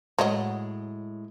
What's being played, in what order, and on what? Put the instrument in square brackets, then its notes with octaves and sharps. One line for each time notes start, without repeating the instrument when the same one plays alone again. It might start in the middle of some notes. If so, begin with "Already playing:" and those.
[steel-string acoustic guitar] A2 G#3 [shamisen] F#3 C#5 D#5